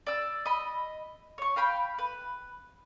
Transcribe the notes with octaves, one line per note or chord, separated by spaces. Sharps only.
D5 E6
D#5 B5
C#5 C#6
F5 G5 B5
B4